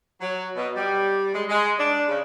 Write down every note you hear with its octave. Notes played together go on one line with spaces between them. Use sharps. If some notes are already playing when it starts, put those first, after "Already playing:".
F#3
B2
G3
G#3
G#3
D4
C#3